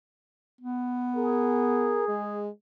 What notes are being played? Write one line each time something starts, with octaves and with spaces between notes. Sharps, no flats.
B3
G#4 A#4
G#3